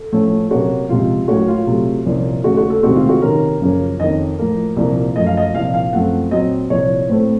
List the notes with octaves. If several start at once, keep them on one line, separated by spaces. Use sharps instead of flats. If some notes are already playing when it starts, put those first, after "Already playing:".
Already playing: A4
A2 F3 A3 C#4
C3 F#3 A#3 C#4 F#4
C#2 C3 F3 F4
A2 F#3 A#3 C#4 F#4
F4
C3 F#3 A3
C2 A#2 F3 A#3 C#4
D#2 C#3 A3 F#4
F#4
A4
C#2 C3 D#3 A3 C4 F#4
F4
F#4
C3 D#3 A#3 C#4 A#4
F#2 C#3 F3 A#3 C#4
F2 D#3 A#3 C#4 D#5
A2 F3 A#3
C2 A#2 F3 A#3
F#2 F3 A3 D#5
F5
D#5
C2 A#2 F3 F5
F5
F#2 F3 A3 C4 F#5
A#2 F#3 C4 D#5
C2 A#2 F3 C#5
A2 A3 C4 C5